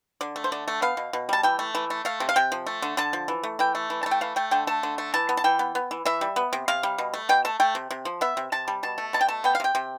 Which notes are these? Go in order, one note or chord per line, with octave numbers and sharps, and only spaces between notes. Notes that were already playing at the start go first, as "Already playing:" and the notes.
D3 D5
A3
C5
D3 D5
A3
B3 F5
B2
B2
G3 A5
E3 G5
A3
E3
A3
A3 F5
C3
F5
C3 G5
F3
A3
D3
D3 A5
F3
E3
A3
E3 G5
A3
E3
A5
A3
G5
E3 F5
A3 G5
D3 G5
A3 A5
D3
A3
E3 A5
B3
A5
E3 G5
B3
B3
E3
E3 E5
G3
B3
C3
C3 F5
G3
B2
A3
B2 G5
A3 A5
A3 G5
C3
C3
F3
B3 E5
C3
C3 A5
G3
B2 A5
A3
B2 A5
G5
A3 A5
B3 G5
F5
C3 G5
C3